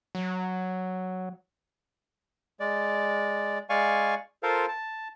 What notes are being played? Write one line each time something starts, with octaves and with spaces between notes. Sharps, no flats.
F#3
G#3 D5
G#3 D5 F5 G#5 C#6
F4 A4 A#4 C5 F5
A5